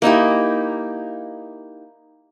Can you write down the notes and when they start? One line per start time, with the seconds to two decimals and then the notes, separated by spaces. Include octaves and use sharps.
0.02 A#3 D#4 E4 G4